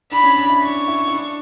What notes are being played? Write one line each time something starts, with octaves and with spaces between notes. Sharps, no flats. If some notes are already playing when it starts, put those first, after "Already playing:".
D4 B5
C#4
D4
E4
D4 C#6
E4
E4
D4